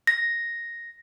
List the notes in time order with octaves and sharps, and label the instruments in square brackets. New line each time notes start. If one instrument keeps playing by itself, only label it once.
[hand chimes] A#6